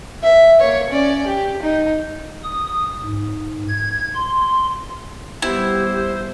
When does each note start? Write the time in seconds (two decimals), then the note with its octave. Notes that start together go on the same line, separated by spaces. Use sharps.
0.23 E5
0.60 A#3 C#5
0.90 C#4 D5
1.27 G4
1.63 D#4
2.44 D#6
3.03 G#2
3.69 G#6
4.15 C6
5.42 G3 B3 E4 G4 C5